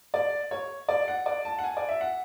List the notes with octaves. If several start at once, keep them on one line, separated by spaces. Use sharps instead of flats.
D5
C#5
D5
F#5
D5
A5
F#5
G#5
D5
E5
F#5